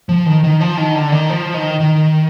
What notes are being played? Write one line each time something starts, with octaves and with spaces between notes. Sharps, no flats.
F3
D#3
D#3
F3
D#3
D3
D#3
F3
D#3
D#3